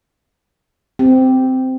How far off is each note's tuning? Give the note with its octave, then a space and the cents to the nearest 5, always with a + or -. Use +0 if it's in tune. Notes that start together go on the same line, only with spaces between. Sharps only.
C4 -10 G4 +0